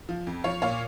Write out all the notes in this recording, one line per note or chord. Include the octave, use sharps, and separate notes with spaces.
F3
F2
F3 C#5 F5
A#2 C#5 F5